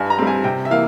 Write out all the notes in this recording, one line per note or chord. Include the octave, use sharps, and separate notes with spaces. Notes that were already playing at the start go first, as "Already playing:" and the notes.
Already playing: G2 G#5
A#5
G3 C4
G#5
C3 G5
E5
E3 A#3 F5